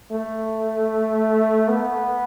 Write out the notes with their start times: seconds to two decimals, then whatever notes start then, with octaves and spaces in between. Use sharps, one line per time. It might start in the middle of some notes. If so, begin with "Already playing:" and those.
0.12 A3
1.68 B3